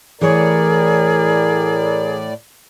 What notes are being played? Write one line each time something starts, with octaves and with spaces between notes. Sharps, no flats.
A2 E3 G#4 A#4 C#5 D5